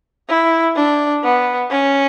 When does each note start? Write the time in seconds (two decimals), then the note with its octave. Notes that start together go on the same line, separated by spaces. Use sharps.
0.29 E4
0.76 D4
1.24 B3
1.71 C#4